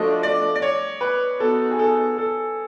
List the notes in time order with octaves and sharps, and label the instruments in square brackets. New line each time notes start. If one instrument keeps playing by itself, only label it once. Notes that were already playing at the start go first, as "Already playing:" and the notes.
Already playing: [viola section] F3 A3 D4 F#4 [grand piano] D#5
[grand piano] D5
D5
C#5
B4
[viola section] B3 D#4 F#4 [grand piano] A4
[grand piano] G#4
A4
A4